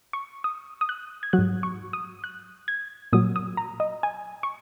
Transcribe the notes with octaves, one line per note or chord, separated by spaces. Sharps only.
C#6
D#6
D#6
F#6
G#6
F#3 F#6
G#2
C#6
D#6
F#6
G#6
A#2 F#3 D#6
D#6
A#5
D#5
G#5
C#6